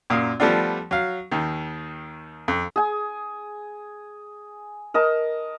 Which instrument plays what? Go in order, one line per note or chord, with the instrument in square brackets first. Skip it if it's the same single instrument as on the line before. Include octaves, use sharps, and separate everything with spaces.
[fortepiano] F#2 A#2 F5 D#6
F3 G3 A3 B3 D4 F4
F#3 F5
D#2 D#3
F2
[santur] G#4 G#5
A#4 D#5 A5